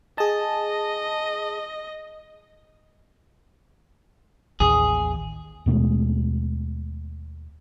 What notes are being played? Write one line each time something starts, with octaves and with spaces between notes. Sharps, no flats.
G#4 D#5 A5
A1 D#2 G#4
D#2 B2 G#3 A3